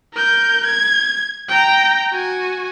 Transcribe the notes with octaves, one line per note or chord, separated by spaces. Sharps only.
A#4 G6
G#6
G5 A#5
F#4 G#5